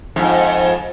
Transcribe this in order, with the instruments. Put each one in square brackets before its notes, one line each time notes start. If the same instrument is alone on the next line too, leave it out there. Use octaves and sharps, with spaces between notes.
[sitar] F2 G#2